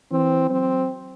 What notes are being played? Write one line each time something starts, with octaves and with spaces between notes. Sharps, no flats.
E3 C4
F#3 C4